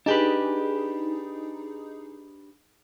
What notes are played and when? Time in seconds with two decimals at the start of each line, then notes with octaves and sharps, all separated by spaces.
0.06 D4 D#4 G4 G#4 B4